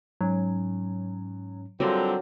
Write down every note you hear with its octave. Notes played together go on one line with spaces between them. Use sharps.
G#2 F#3 C#4
D3 F#3 G3 C4 F4 A#4 D5